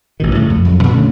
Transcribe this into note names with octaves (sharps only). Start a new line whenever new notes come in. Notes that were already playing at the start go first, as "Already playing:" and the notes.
A1 B2 D#3
A2 C#3 A3
F2
F2 F#3
A#2 D#3 E3
D3 A3 C#4